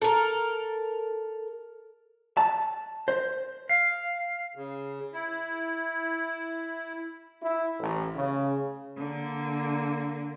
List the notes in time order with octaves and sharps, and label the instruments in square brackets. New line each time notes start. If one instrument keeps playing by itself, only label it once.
[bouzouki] A4 A#4
[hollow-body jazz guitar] A5
C5
[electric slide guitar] F5
[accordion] C#3
E4
[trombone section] E4
A1
C#3
[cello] D3 A#3